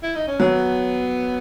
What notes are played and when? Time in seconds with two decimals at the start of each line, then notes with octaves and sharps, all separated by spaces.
0.03 E4
0.15 D#4
0.27 C#4
0.40 F#3 B3